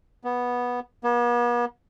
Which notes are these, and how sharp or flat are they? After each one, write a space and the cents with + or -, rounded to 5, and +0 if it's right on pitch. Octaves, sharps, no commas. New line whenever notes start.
B3 -10
B3 -45